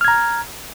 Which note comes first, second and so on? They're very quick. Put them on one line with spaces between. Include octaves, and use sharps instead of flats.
F6 G#6 A#5